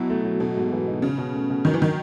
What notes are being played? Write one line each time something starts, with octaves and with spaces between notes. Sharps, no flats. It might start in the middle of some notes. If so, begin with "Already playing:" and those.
Already playing: B2 F#3 E4
A3
F#3
B2 A3
G#2
E3
D#4
C#3 C#4
B2
A3
B2
D#3 F#3
E3
D#3